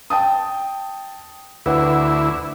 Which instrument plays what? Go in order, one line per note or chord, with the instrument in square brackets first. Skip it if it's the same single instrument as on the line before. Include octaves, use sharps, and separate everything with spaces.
[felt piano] G5 A5 D#6
[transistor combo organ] D2 E4 [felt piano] B4 F#5